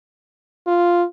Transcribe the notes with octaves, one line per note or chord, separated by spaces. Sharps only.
F4